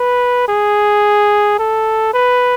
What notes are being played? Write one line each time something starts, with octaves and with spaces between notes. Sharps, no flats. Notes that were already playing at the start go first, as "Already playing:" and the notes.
Already playing: B4
G#4
A4
B4